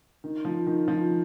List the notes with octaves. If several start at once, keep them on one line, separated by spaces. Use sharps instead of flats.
D#3
F3
D#3
F3